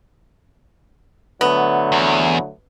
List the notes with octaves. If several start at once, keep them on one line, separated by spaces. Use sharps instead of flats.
D3 F#3 A3 B3
E2